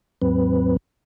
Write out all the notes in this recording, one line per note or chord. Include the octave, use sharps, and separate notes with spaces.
D#2 G#2 F#3 C4 B4